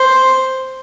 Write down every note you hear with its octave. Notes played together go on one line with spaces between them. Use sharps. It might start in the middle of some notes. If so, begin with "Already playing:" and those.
Already playing: C5